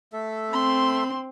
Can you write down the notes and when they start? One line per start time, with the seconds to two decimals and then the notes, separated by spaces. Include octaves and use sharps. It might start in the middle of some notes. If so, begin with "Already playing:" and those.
0.13 A3 A4 E5
0.53 C4 C6